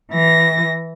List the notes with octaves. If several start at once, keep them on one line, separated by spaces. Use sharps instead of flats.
E3 A#6